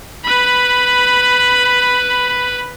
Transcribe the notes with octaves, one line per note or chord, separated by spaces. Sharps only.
B4 B5